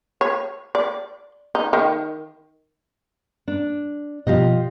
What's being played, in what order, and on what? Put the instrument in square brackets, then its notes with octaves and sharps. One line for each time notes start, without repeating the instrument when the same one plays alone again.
[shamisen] C#5
D5
D#4
D#3
[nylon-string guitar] D4
[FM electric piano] B2 F3 [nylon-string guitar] F4 G4 D#5